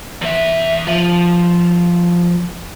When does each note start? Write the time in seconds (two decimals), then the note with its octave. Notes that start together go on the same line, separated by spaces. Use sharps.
0.21 E2 E5
0.87 F3